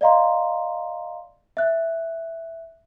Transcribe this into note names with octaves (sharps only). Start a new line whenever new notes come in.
D5 D#5 F5 A#5 C6
E5 F#6